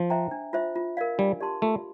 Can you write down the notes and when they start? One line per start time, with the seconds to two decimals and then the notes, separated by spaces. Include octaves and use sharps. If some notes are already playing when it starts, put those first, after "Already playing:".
Already playing: F3
0.10 C5 E5 G5 A#5
0.31 D4
0.53 F4 C5 E5
0.76 F4
0.97 A#4 D5 F5
1.18 G3 D4
1.41 G4 D5 A5 C6
1.62 A3 F4